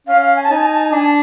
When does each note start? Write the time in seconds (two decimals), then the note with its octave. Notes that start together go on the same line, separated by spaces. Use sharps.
0.07 C#4 F5
0.22 F5
0.36 G#5
0.44 A5
0.50 D#4 G#5
0.58 A5
0.66 G#5
0.73 A5
0.81 G#5
0.88 A5
0.92 D4 G#5
1.03 A5